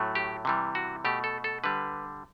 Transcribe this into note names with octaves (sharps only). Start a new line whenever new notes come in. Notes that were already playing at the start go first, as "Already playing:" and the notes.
Already playing: A2 F#3 A3
G4
C3 E3 G3
F#4
B2 A3 G4
A4
A4
D3 G3 B4